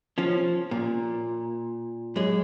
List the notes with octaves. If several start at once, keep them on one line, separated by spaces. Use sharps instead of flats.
F3 C#4
A#2
F#2 G#3